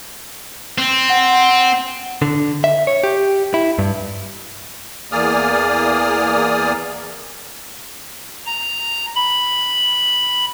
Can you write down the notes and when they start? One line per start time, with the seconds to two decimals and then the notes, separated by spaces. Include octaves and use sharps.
0.78 C4
1.09 F#5
2.22 D3
2.64 E5
2.87 C#5
3.04 G4
3.54 E4
3.79 G2
5.12 E2 A#3 G#4 D5 D#6 F6
8.46 A#5
9.16 B5